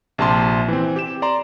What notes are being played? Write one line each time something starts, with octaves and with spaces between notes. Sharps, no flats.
A#1 C3 A5 C6
E3 C4
G4 E7
D5 A#5 C6